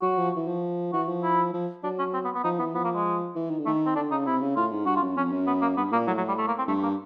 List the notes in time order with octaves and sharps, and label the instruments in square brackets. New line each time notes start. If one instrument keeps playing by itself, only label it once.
[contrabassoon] F#3 [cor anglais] F#4
[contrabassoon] F3
E3
F3
[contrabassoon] E3 [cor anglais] F#4
[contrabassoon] F3
[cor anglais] E4
[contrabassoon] F3
[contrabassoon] F#3 [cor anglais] D4
[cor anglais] C#4
C4
B3
B3
[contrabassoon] F3 [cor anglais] D#4
[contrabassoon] E3 [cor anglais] B3
[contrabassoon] F3 [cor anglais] B3
[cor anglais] A#3
G#3
[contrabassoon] E3
D#3
D3
[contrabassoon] D#3 [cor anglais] A3
[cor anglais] C4
[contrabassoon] D3 [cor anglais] D4
[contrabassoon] C#3 [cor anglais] D#4
[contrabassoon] C3 [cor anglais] E4
[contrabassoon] C#3
[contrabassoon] A2 [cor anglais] F4
[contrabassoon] G#2
[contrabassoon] G2 [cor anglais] F#4
[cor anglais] F4
[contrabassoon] F#2
[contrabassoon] F2 [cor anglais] C#4
[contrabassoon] F#2
[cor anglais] B3
A#3
[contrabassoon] G2 [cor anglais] B3
[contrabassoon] A#2 [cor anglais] A#3
[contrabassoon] A2 [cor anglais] F#3
[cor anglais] F#3
G3
A3
A#3
C4
[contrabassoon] G2 [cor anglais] A3
[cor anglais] A#3